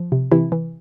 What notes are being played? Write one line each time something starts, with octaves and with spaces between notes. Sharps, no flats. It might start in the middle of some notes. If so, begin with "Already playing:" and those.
Already playing: F3
C3
C3 E3 E4
E3